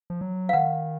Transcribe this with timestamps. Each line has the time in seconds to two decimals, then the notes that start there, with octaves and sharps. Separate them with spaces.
0.10 F3
0.21 F#3
0.49 F5
0.53 D#3 F#5